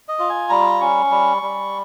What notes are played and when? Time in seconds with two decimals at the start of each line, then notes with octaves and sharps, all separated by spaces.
0.09 D#5
0.19 F4
0.30 G#5
0.50 G3 A#5
0.81 C#4 C#6
1.11 G3
1.42 G3